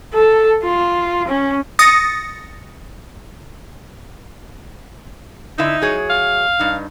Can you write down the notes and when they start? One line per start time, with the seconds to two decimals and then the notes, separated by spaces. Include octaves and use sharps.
0.14 A4
0.63 F4
1.28 C#4
1.79 D#6 A6 A#6 C#7
5.58 D3 D#4 E4 E5
5.82 F#3 G#4 C#5
6.10 F5
6.59 G2 D#4